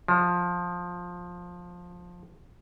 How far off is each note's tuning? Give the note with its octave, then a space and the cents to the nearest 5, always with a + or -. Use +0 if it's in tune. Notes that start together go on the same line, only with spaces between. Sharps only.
F3 +15